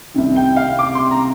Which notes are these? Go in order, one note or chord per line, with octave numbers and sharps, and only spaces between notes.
C2 C3 D#3
G5
F5
D6
C6
A#5